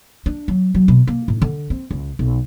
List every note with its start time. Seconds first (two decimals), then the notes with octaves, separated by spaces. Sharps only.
0.26 D4
0.48 F#3
0.75 F#3
0.88 B2
1.07 A#3
1.28 A2
1.42 D3
1.70 C4
1.91 C#2
2.19 B1